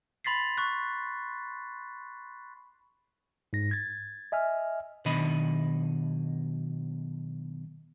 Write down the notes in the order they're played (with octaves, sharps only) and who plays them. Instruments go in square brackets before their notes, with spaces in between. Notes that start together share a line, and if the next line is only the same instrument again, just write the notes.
[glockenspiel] B5 C6 A6 B6 C7
C#6 F#6
[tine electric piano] G#2 A#6
G#6 A6
D#5 E5 G#5 F6
[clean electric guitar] B1 B2 D#3 D4 D#5 B5